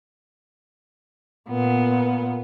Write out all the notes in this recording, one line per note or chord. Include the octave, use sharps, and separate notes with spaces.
A#2 B3